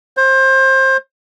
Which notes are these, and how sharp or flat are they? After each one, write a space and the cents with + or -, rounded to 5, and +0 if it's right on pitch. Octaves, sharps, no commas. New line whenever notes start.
C5 +25